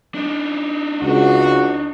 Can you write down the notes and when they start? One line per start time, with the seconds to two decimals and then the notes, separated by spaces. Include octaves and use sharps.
0.15 D4 D#4
1.02 C#2 F#4